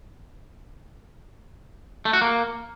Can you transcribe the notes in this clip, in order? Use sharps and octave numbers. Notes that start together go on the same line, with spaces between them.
A3
F#4
A#3